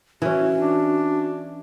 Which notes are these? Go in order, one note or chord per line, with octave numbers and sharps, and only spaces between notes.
E3 C#4 F#4
D4